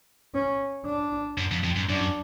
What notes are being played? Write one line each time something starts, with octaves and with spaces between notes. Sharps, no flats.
C#4
D4
F#2
F2
F2
F#2
F#2 D4